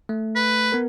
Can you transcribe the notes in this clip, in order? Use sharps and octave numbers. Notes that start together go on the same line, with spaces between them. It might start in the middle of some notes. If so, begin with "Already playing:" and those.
A3
B4
B3 A#4